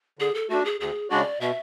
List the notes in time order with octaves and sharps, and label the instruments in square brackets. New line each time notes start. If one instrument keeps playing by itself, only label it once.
[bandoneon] D3 [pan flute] G#4
[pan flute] A4
[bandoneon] A3 D4 [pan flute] F#4
[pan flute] G#4
[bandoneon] D2 [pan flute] G#4
[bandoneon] C#3 G#3 D4 F#4 [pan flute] D5
[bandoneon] B2 [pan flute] E5